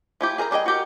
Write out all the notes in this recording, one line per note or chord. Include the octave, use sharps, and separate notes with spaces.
F3 E4 G4
G#4 A#4 C5 A#5
G3 D4 G#4 D#5 G5
F#4 G4 A#4